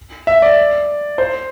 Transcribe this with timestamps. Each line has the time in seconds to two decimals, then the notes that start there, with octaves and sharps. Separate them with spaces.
0.27 E5
0.42 D5
1.18 C5